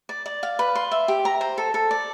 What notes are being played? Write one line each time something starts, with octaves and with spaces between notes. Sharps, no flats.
D5
D5
F5
B4
C6
E5
G4
A#5
C5
A4
A4
D5